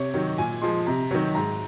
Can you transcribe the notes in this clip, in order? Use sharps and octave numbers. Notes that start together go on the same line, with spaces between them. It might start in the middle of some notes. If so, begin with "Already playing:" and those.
Already playing: C3 C#5
D#3 F#3
A#2 G#5
F3 G#3 C6
C3 A#5
D#3 F#3
G#2 A#5